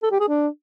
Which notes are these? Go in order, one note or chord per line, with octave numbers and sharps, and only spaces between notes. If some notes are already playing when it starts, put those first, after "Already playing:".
A4
G4
G#4
D4